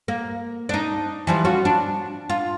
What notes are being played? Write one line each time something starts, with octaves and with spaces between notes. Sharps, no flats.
A#3
D4 D#4
E3 F3 G3
C#4 F4 F#4
D4
F4